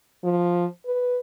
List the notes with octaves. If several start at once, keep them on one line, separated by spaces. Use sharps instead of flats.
F3
B4